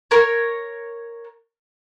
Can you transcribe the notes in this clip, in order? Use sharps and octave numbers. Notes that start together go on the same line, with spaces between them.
A#4 C#5